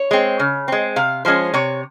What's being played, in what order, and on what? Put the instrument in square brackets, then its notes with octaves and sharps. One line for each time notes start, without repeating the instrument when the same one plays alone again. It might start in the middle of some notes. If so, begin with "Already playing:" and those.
Already playing: [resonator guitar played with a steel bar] C#5
G#3 C4
C#3
G#3 C4
C3 F5
F3 G#3 C#4 C5
C3 C#5